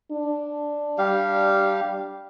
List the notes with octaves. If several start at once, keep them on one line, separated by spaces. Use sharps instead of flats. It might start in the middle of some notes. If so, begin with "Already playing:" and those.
D4
G3 G4 F5